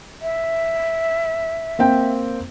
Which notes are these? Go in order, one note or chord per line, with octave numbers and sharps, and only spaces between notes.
E5
A#3 C4 G5